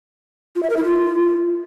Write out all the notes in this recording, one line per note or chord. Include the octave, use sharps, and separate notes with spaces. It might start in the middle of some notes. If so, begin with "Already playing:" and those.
F4
E5
A#4
E4
F4